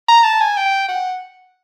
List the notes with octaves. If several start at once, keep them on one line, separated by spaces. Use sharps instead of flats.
A#5
A5
G#5
G5
F#5